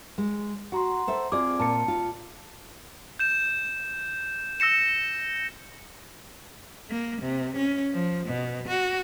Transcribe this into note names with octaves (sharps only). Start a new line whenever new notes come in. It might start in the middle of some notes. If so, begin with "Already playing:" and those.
G#3
F#4 F#5 A#5 C6
A4 C5 E5
C4 F4 G#4 D5 D6
A#2 A5 C#7
F4
G6 E7
E6 A#6 C#7 E7
A#3
C3
C#4
F3
B2
F#4